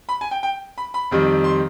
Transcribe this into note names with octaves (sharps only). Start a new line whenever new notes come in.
B5
G#5
G5
G5
B5
B5
F2 D#3 G3
C6